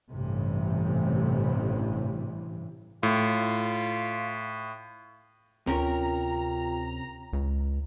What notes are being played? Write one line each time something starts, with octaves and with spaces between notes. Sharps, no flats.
A1 G2 C3 E3
A2 F4
D2 C3 C#4 F4 A#4 G5 A#5
C#2